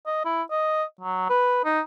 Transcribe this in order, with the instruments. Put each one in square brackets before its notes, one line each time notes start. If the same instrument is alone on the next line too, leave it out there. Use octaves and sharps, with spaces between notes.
[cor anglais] D#5
E4
D#5
F#3
B4
D#4